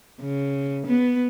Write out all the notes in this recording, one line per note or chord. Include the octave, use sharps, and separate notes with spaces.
C#3
B3